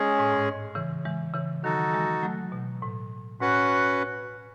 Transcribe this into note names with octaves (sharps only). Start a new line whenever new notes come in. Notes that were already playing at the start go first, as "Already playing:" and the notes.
Already playing: G#3 C#4 G#4
A2
G#2
C#3 E3
E3 G#3
C#3 E3
D#3 F#3 D#4 F#4 A4
E3 G#3
F#3 A3
B2
A2
A2 C#4 F#4 B4 F#5